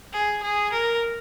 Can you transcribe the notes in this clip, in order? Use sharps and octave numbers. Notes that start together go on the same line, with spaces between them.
G#4
G#4
A#4